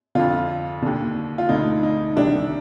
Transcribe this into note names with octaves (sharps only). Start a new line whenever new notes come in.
F2 D3 F4
D#2 D3
F4
D2 D3 D#4
D#4
C2 C3 D#3 D4